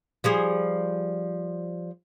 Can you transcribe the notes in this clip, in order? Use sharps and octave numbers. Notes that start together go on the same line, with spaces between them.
F3 G3 G#4